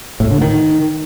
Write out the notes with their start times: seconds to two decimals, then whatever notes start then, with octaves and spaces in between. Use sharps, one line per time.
0.20 A2
0.31 D3
0.42 D#3